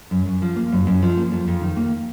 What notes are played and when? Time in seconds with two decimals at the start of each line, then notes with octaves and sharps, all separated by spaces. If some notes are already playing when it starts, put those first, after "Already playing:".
0.11 F#2
0.26 F#2
0.42 F3
0.56 A#3
0.72 F#2
0.87 F#2
1.02 F3
1.16 A#3
1.32 F2
1.48 F2
1.61 D#3
1.77 A#3